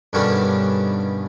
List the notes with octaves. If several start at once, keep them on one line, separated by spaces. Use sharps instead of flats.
G2 B2 D3 D#3 C#4 D4